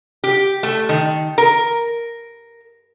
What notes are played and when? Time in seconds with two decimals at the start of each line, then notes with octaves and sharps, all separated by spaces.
0.24 G4
0.63 A3
0.89 D#3
1.38 A#4